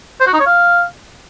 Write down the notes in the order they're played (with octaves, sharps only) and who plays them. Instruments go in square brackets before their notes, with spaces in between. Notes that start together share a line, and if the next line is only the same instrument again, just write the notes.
[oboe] C5
F#4
D#4
C#5
F5